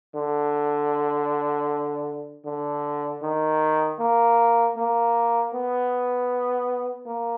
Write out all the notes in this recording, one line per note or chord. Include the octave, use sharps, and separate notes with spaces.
D3
D3
D#3
A#3
A#3
B3
A#3